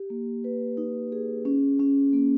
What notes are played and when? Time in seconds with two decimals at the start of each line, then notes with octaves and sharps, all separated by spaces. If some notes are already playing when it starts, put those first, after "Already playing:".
Already playing: G4
0.10 A#3
0.44 B4
0.77 D#4
1.12 G#4
1.45 C#4
1.79 C#4
2.13 A#3